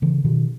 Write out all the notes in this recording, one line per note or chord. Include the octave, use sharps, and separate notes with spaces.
C#3 E3
B2 D#3